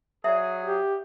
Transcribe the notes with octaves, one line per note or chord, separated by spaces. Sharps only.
F#3 G#4 D5 E5
G4